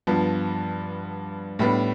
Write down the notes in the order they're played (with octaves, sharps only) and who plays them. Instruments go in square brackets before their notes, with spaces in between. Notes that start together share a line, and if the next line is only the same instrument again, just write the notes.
[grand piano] G2 F3 B3
A2 G3 B3 D4